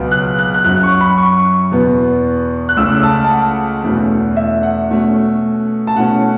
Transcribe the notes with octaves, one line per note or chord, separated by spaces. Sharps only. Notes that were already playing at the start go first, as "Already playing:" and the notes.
Already playing: C#2 B2 F#3 B3
F#6
F#6
F#6
F#2 F#3 C#4 F#6
C#6
B5
C#6
E2 B2 B3
F#6
C#2 C#3 A3 C#4 E6
A5
A5
F#5
E2 B2 A3 C#4
E5
F#5
B2 A3 C#4
A5
B2 A3 C#4 F#5